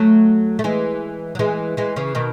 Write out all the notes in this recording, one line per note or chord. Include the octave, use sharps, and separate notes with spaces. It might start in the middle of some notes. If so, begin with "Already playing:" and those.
Already playing: F#3 A3
A3
E3 G#3
F#3
E3 G#3
E3 G#3
C#3 E3
B2 D#3